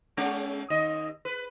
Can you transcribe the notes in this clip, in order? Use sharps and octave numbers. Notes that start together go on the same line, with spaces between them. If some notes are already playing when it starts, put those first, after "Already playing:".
G#3 C#4
D#2 D#5
B4